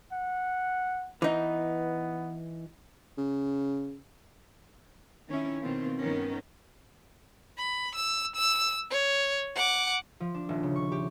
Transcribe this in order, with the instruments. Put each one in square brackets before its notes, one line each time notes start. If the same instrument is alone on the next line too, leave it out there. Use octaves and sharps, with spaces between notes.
[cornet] F#5
[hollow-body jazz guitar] E3 D#4 [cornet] B3
[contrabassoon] C#3
[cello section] D#3 C#4 E4
B2 D#3 C4 F4
G2 D#3 B3 C#4 A#4
[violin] B5
E6
E6
C#5
F#5 D6
[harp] F3
D4
D#1
C#3
C#6
G4